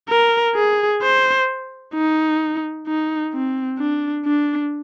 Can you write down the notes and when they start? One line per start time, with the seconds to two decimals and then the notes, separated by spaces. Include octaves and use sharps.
0.09 A#4
0.55 G#4
1.02 C5
1.94 D#4
2.87 D#4
3.33 C4
3.79 D4
4.25 D4